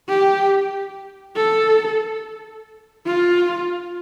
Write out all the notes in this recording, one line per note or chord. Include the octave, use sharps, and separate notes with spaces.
G4
A4
F4